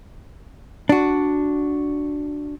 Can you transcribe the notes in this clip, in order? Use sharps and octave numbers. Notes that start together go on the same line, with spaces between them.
D4 F#4